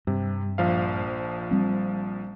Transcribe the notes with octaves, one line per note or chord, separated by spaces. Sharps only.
G2 C3
A#1 F3 F5
G3 C4